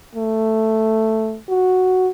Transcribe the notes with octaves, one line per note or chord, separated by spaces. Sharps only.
A3
F#4